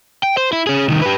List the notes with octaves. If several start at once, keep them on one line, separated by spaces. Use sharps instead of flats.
G5
C5
E4
C#4 G#4
C2 D#3
G4 B4